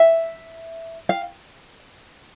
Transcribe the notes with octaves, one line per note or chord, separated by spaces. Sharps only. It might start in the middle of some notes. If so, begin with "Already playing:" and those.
Already playing: E5
F5